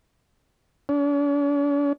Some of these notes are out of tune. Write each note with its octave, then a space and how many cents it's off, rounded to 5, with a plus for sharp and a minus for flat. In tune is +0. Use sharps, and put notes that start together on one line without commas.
D4 -45